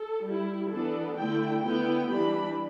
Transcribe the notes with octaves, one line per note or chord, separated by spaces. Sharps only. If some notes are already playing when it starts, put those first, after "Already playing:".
Already playing: A4
G3 E4
E3 B3 D4 A4
D3 A3 E4 G5
D3 B3 E4 G5
E3 G3 D4 B5